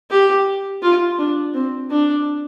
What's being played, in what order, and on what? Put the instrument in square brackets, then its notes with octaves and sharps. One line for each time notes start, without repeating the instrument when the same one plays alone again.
[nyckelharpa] G4
F4
D4
C4
D4